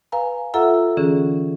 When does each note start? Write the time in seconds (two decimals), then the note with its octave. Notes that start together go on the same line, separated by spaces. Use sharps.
0.12 B4 F5 G#5 A#5
0.54 F4 A4 E5 F#5 A#5 E6
0.97 D3 E3 C#4 G#4